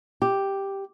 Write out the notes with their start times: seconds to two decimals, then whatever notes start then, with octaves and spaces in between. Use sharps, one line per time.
0.22 G4